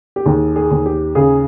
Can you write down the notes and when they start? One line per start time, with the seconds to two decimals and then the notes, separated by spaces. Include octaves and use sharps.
0.16 G4
0.26 D#2 G#4
0.56 G#4
0.71 D#2
0.86 G4
1.15 C#3 G#4